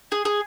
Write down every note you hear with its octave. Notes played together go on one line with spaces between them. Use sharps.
G#4
G#4